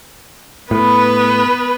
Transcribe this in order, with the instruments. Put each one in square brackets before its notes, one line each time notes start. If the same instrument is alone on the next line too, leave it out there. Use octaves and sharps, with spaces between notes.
[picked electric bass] A2 [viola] B3 B4